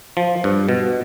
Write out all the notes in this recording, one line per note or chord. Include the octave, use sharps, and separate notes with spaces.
F3
G2
B2